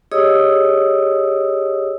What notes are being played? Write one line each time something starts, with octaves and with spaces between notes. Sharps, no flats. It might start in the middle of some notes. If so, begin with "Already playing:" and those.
G4 G#4 C#5 D#5 D#6 E6